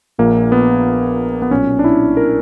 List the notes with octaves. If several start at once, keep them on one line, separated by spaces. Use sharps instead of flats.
A#1 A#2 A#3
B3
B3
B1 A#2 C#4
D4
E4
A#4